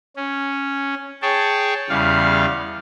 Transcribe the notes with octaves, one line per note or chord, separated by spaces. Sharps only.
C#4
G#4 C#5 G5 A5
E2 C#3 G3 F5